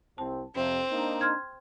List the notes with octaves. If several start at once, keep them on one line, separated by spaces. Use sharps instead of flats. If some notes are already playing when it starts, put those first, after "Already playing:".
C2 C4 A5
F2 C3 C4
A#3 D4 D#4
C6 F6 G#6